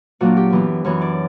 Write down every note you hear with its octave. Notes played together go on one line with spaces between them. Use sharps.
A#2 F#3 A#3 D4 F#4
G4
F#2 E3 B3
F#2 E3 B3 C#5
D5